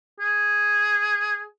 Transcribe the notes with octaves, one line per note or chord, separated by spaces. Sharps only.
G#4